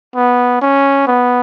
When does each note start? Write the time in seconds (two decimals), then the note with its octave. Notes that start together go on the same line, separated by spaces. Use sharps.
0.15 B3
0.61 C#4
1.07 B3